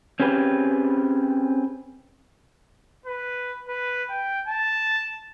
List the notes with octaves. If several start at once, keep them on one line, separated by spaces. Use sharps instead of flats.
C4 C#4 G4 G#4 B4
B4
B4
G5
A5